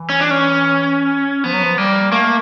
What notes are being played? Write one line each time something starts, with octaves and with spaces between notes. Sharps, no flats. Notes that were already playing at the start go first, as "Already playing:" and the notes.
Already playing: E3
C#4
D4
C#4
F3 B3
F#3
F3
G3 A#3
A3 A#3